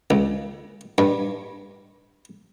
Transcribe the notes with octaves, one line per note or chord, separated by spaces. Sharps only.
C#2
G2